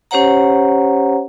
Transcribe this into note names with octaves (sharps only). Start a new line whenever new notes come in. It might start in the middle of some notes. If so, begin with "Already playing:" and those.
C#4 G4 C5 C#5 F#5 A#5